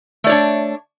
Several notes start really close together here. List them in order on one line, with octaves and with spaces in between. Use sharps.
A3 D5 C#5 D4